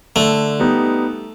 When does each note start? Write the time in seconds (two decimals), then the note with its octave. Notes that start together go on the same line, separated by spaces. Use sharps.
0.16 D3 A3
0.59 G3 B3 D#4